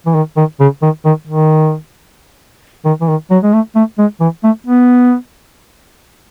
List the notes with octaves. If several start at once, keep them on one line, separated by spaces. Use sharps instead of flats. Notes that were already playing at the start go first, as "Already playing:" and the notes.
E3
D#3
D#3
C#3
D#3
D#3
D#3
D#3
E3
D#3
F#3
G#3
A3
A3
G#3
E3
A3
B3